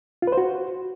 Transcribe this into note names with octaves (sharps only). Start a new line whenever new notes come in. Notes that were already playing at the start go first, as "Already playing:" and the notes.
F4
B4
C5
F#4